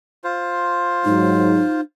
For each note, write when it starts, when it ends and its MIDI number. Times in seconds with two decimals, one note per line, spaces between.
0.24 1.81 65
0.24 1.81 72
1.05 1.60 44
1.05 1.60 54
1.05 1.82 63